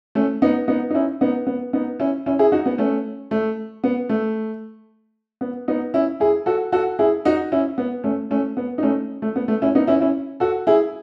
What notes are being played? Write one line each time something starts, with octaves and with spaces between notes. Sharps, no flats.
A3 C#4
B3 D#4
B3 D#4
D#4
C#4 E4
B3 D#4
B3
B3 D#4
C#4 E4
C#4 E4
E4 G#4
D#4 F#4
B3
A3 C#4
A3
B3
A3
B3
B3 D#4
C#4 E4
E4 G#4
F#4 A4
F#4 A4
E4 G#4
D#4 F#4
C#4 E4
B3
A3 C#4
A3 C#4
B3
D#4
A3 C#4
A3
B3
A3
C#4 E4
B3 D#4
C#4 E4
C#4 E4
F#4 A4
E4 G#4